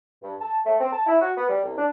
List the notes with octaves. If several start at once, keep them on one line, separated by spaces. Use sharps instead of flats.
G2
A5
A3
C4
A5
E4
F#4
B3
G3
C2
D4